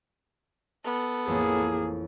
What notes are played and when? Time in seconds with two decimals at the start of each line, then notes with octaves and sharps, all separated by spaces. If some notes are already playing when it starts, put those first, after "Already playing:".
0.84 B3 A4
1.27 A1 F2 A#3 G#4 A5